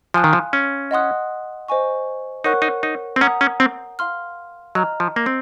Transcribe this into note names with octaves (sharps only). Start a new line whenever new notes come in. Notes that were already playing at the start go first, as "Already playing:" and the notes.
F3 F5 G#5 C6 D#6 F#6
D#3
F3
C#4
D#5 F#5 C6 D#6 F#6
C5 D#5 G#5 C#6
D#4 A#4 C#5 F#5 C#6 F#6
D#4
D#4
C4
C#4 F#5 A#5 D#6
C#4
C4
F5 C6 F6
F#3 D#5 A#5 F6
F3
A#3
C4